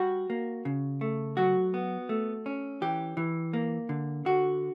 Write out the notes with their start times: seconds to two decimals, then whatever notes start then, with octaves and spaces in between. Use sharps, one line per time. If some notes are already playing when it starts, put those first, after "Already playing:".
Already playing: G3 F#4
0.30 A#3
0.65 C#3
1.01 A3
1.37 F#3 F#4
1.74 B3
2.09 A3
2.46 C#4
2.82 E3 G4
3.17 E3
3.53 A#3
3.89 D3
4.25 D3 F#4